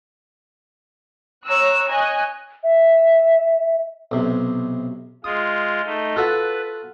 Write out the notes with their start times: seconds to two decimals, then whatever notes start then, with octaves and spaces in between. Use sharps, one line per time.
1.44 C#5 A#5 E6 F#6
1.87 C#5 D#5 G#5 F#6
2.63 E5
4.11 B1 C3
5.24 G#3 F4 D#6
5.85 A3 D#4
6.16 F4 F#4 A4 B4